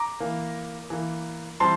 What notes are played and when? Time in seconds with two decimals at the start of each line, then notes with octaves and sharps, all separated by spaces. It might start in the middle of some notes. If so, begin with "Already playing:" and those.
Already playing: A#5 D6
0.20 E3 A#3
0.90 E3 A#3
1.60 E3 G3 C4 A5 C6